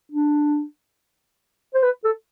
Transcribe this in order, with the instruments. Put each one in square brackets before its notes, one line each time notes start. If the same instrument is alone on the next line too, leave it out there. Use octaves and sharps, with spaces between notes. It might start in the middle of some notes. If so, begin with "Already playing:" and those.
[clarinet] D4
C5
B4
A4